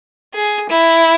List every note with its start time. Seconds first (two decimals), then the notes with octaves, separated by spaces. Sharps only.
0.34 G#4
0.70 E4